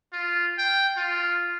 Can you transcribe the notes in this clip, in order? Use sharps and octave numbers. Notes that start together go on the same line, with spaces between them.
F4
G5
F4